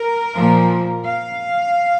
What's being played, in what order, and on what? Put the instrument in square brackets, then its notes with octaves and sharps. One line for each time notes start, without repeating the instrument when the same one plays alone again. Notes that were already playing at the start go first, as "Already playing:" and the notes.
Already playing: [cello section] A#4
A#2 F3
F5